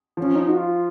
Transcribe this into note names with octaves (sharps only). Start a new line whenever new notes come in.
F3 C#4
D#4
F#4
F4